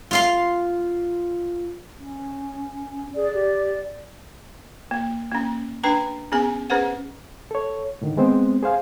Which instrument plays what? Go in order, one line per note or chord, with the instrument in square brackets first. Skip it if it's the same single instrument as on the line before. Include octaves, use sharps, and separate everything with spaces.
[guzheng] F4 F5 C6
[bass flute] C#4
[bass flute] G#4 [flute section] D5
[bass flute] G4
[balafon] A#3
A#3 C#4
D4 B4 G5 A#5
B3 C#4 G#4 G#5
C#4 G#4 B4 C5 F#5
[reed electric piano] A4 C#5
A2 D3 D#3
G#3 B3 C4 C5
G#4 C5 F5 G#5